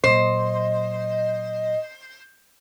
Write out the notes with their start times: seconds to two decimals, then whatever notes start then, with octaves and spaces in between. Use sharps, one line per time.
0.04 A#2 F#3 C5 D#5